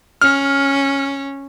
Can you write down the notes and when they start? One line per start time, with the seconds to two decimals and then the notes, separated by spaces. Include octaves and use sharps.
0.21 C#4 F6